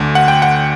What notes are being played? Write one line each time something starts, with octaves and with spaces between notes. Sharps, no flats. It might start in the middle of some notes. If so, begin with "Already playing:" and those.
Already playing: D2 D3
F#5
G5
F#5